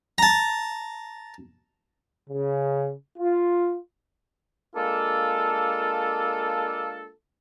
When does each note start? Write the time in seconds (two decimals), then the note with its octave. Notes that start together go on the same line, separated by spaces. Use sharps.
0.18 A5 A#5
2.28 C#3
3.17 F4
4.76 G#3 A#3 D4 F4 A4